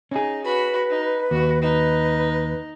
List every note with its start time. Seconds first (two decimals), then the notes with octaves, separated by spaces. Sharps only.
0.11 C#4 D#4 G#4
0.44 F#4 B4 B5
0.90 D#4
1.31 D#2 F#4
1.62 D#4 B4